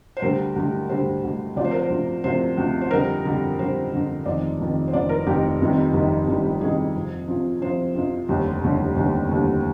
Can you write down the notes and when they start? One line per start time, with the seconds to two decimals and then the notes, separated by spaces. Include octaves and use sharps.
0.17 C5
0.22 D2 D3 G3 A#4
0.56 D2 D3 G3
0.89 D2 D3 G3 C5
1.23 D2 D3 G3
1.56 D2 C3 F3 D5
1.65 C5
1.71 A#4
1.79 C5
1.90 D2 C3 F3
2.24 D2 C3 F3 C5
2.57 D2 C3 F3
2.81 C5
2.91 F2 D3 G3 A#4
3.25 F2 D3 G3
3.58 F2 D3 G3 C5
3.92 F2 D3 G3
4.25 F1 F2 D#3 D5
4.59 F1 F2 D#3
4.88 C5
4.92 F1 F2 D#3 D5
5.09 A#4
5.26 F1 F2 D#3 G4
5.60 F1 F2 C3 D#3 G3
5.93 F1 F2 C3 D#3 G3
6.27 F1 F2 C3 D#3 G3
6.61 F1 F2 C3 D#3 G3 G#4
6.95 F2 C3 F3
7.28 F2 C3 F3
7.61 F2 C3 F3 C5
7.95 F2 C3 F3
8.29 F1 D#2 D3 G3
8.62 F1 D#2 D3 G3
8.96 F1 D#2 D3 G3
9.29 F1 D#2 D3 G3